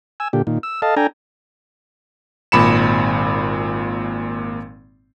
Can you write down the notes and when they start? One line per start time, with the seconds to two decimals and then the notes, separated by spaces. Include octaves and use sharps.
0.20 G#5 E6
0.33 A#2 D3 G4
0.47 A#2 D#3
0.63 E6
0.82 A4 D#5 F5 A5
0.97 D4 A4 G5 G#5 A#5
2.52 G#1 A#2 B5 C#7 E7